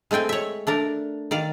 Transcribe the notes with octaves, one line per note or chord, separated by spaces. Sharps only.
G#3 A3 C4 G5 G#5
C#5 E5
A3 D4 A#4
D#3 D5 F5